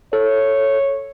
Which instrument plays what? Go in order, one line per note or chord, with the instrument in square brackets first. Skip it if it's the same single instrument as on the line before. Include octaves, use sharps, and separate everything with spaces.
[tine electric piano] A4 [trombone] C#5